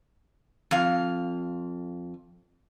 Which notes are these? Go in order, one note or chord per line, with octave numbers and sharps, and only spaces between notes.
F2 F5